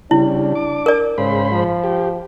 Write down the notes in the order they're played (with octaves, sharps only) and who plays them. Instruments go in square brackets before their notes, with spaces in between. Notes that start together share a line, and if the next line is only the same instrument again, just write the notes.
[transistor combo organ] C#3 G3 [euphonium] D4 [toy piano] E4
[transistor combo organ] D6
[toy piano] A#4 D5
[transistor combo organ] G#2 C5 B5 [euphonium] C#3
[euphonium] F3
[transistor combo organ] G4